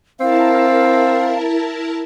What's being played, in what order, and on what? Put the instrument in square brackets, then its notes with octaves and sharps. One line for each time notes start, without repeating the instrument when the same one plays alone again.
[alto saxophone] C4 [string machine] E4 A#4 A5 [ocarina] F5